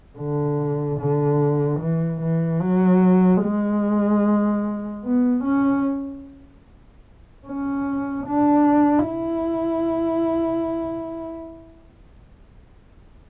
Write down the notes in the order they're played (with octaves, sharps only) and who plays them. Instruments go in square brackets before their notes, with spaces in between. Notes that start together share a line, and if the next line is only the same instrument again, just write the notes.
[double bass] D3
D3
E3
E3
F#3
G#3
B3
C#4
C#4
D4
E4